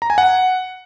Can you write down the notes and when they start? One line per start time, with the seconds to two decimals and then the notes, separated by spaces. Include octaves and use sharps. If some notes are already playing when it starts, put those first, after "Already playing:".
0.02 A#5
0.10 G#5
0.18 F#5